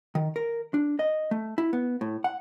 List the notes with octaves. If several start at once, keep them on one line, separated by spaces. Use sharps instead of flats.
D#3
A#4
D4
D#5
A3
E4
B3
A2
F#5